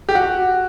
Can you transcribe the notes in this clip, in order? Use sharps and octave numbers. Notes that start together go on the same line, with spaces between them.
G4
F#4